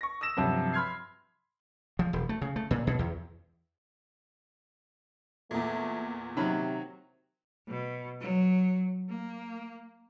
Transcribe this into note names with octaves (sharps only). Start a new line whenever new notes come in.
C#6 A#6
D#6 E6 A#6 E7
G2 C3 F3 F#3
B5 C6 F6 G#6 C7
F3
E1
A3
C#3
A3
A#2
B2
E2
E2 A#2 A3
C3 D#3 F#3 B5
B2
F#3
A#3